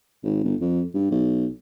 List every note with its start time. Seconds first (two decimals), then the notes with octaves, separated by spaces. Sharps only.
0.24 G#1
0.44 G1
0.61 F2
0.94 G2
1.11 B1